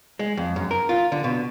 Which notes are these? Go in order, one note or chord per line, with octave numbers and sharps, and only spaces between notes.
G#3
F2
F#2
A#4
F4
D3
B2